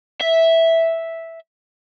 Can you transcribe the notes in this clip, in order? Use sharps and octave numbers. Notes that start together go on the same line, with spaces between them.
E5